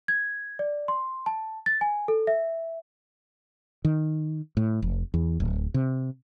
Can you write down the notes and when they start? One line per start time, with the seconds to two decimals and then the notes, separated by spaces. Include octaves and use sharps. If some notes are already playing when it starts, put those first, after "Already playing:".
0.08 G#6
0.59 D5
0.88 C6
1.26 A5
1.66 A6
1.81 G#5
2.08 A4
2.27 E5
3.85 D#3
4.57 A2
4.82 F1
5.14 E2
5.40 D1
5.74 C3